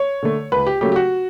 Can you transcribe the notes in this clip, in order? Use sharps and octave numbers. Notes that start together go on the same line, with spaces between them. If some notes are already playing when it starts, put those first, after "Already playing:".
Already playing: C#5
D3 A3
C#2 B4
G4
C#3 F#3 A3 G4
G4
F#4